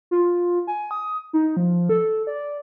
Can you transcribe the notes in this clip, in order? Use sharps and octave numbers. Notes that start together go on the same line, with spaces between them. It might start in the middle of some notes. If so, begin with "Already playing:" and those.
F4
G#5
D#6
D#4
F3
A4
D5